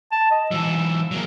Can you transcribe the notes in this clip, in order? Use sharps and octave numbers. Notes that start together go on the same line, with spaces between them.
A5
D#5
E3 F#3 E6
F#3 A#3